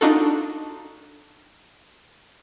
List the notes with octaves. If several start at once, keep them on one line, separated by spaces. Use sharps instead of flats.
D4 D#4 F4 F#4 A4